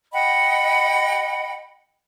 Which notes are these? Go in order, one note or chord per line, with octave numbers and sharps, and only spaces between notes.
D#5 F#5 G5 B5